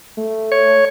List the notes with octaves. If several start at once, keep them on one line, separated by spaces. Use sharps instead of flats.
A3
C#5